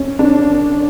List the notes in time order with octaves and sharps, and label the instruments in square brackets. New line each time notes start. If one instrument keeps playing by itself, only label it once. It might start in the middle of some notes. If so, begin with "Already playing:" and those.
Already playing: [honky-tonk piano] C#4
D4